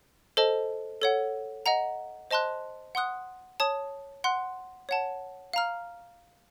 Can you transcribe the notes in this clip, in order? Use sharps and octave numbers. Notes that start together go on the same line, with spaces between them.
A4 C5 D#5 A5
A4 C#5 F#5
D#5 F#5 A#5
C5 D#5 A5 C6 F#6
F#5 C6 D#6 F#6
C#5 A5 D#6
F#5 C6 F#6
C#5 F#5 A5
F5 A#5 F6